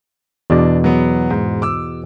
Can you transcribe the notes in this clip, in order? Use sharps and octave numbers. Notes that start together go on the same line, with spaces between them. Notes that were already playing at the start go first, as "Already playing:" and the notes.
E2 B2 D4 D5
F#3 B3
G#2
D6 E6